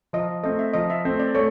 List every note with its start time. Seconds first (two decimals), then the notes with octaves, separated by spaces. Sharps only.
0.13 F3 D#5
0.43 A3 C4 D#5
0.59 E5
0.74 F3 D#5
0.90 E5
1.05 A3 C4
1.20 D5
1.34 A3 C#5